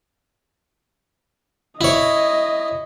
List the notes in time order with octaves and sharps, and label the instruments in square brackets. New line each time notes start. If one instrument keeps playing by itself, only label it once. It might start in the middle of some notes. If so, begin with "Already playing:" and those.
[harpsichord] E4 C#5 [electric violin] D#5